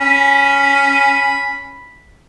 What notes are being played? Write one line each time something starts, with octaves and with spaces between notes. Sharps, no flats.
C#4 B5